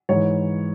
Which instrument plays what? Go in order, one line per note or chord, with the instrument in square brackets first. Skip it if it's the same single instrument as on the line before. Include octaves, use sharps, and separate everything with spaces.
[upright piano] G#2 E3 C#5